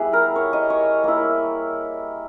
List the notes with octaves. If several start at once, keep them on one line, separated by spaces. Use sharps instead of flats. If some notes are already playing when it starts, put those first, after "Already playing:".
Already playing: G3 B3 E4 G#4
A#4
C#5
D#5
C#5
A#3 E4